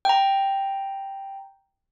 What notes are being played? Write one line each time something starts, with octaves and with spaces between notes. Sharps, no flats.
G5 A#5